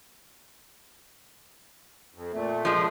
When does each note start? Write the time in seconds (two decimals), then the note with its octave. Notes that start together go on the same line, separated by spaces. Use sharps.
2.14 F2
2.33 A#2 A3
2.65 F3 G#3